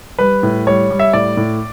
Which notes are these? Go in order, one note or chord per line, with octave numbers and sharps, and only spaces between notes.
G3 B4
A2
G3 C#5
G3
E5
A2 D5
A2